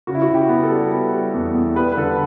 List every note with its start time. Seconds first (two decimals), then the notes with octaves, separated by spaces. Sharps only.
0.07 C#3 F#4
0.15 E4
0.22 F#4
0.29 C#3
0.35 G4
0.49 B3
0.63 A4
0.70 G3
0.92 B3
1.12 G3
1.34 E2
1.55 E2
1.75 G3 B4
1.92 B4
1.97 D3 A4